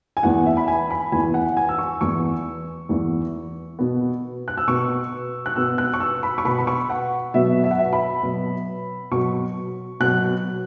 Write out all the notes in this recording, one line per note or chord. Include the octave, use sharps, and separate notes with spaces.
G#5
E2 E3 B3 F#5
E5
B5
G#5
B5
E2 E3 B3 G#5
F#5
G#5
E6
C#6
E2 E3 B3 C#6
E2 E3 B3
B2 B3
F#6
E6
B2 B3 C#6
F#6
B2 B3 E6
F#6
C#6
E6
B5
C#6
B2 B3 B5
B5
C#6
F#5
B2 F#3 B3 E5
E5
F#5
E5
B5
B2 F#3 B3
B2 F#3 B3 C#6
B2 F#3 B3 F#6